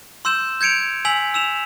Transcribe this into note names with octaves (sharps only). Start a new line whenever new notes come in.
C6 E6 G6 E7
G6 G#6 C#7 D7 F7
G#5 E6 B6 F7 F#7
E6 E7 F7